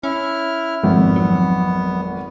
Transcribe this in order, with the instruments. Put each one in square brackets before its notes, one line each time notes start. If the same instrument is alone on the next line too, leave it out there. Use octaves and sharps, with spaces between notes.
[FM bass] C#4 [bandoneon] E4 F6
[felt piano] G#1 F2 [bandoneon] B3
[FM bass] F#3